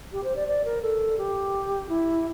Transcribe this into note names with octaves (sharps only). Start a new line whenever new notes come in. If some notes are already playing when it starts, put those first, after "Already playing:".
G4
C5
D5
D5
A#4
A4
G4
E4